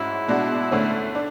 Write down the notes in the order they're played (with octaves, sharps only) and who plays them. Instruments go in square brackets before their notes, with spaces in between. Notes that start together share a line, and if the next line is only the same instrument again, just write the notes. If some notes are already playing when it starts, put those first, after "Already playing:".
Already playing: [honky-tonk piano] G#2 G#3 C#4 F#4 [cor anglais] E4
[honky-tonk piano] B2 G#3 D4 F#4
D2 D3 A3 C#4
D4